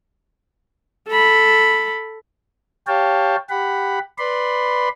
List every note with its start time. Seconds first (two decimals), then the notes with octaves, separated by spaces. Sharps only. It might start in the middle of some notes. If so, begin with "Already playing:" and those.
1.08 A4 B5
2.87 G4 C#5 F5 G5 A5
3.49 G4 F#5 B5
4.18 B4 D5 B5 C6